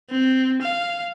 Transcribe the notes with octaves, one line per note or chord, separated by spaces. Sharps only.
C4
F5